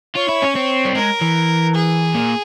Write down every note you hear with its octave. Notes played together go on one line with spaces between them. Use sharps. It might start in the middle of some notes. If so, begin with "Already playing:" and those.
F4 C#5
E4
C#4
C4
G3
G#3 A#4
E3
G#4
A#2